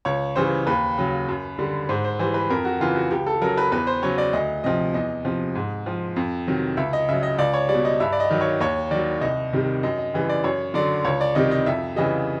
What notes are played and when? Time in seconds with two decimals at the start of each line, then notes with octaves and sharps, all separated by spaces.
0.05 C#2 C#5
0.36 C#3 E3 G3 C5
0.67 D#2 B4
0.98 C#3 F#3
1.28 F#2
1.59 D3 G3
1.89 G#2 C5
2.04 C5
2.19 E3 G3 C5
2.34 B4
2.50 F2 A#4
2.65 F#4
2.80 C#3 E3 F4
2.96 F#4
3.11 C#2 G4
3.27 A4
3.41 C#3 F#3 A#4
3.57 B4
3.72 E2 B4
3.87 C5
4.03 C#3 F#3 C#5
4.18 D5
4.33 D2 D#5
4.64 C3 F3 D#5
4.94 E2 D#5
5.25 C3 F3
5.55 G#2
5.86 F3
6.16 F2
6.47 C3 D#3 F#3
6.77 C#2 E5
6.93 D#5
7.09 C#3 F#3 E5
7.23 D#5
7.38 C#2 D5
7.53 C#5
7.69 G3 D5
7.74 B2
7.85 D#5
8.00 G2 E5
8.12 D5
8.20 D#5
8.31 D#3 F#3
8.41 C#5
8.60 D#2 C#5
8.91 D#3 F#3 D5
9.21 C2 D#5
9.53 C3 D#3 G3
9.83 F#2 D#5
9.98 D#5
10.14 C#3 E3 G3
10.29 D5
10.44 F#2 C#5
10.74 D3 F#3 D5
11.05 C#2 C#5
11.21 D5
11.35 C3 D#3 G3 D#5
11.51 D#5
11.66 F2 E5
11.96 C#3 E3 G3 D#5